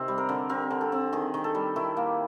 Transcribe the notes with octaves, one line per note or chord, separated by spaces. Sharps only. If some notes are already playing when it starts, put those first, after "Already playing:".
Already playing: C3 D#3 C4
G3
A#4
D3
C4 A#4
D3
A4
C4
D#3 G#4
D#3
A4
G3
D#3 E4
A#3